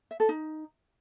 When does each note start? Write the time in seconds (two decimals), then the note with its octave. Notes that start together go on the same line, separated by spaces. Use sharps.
0.11 E5
0.20 A4
0.29 D#4